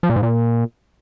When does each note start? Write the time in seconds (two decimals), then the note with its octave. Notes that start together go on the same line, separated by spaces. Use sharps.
0.03 F3
0.10 A#2
0.16 G#2
0.23 A#2